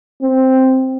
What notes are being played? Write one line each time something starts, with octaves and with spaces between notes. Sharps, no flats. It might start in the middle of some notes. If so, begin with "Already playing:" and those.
C4